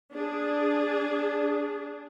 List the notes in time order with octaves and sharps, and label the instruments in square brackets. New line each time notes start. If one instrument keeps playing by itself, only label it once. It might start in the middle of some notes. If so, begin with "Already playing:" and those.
[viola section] D4 G#4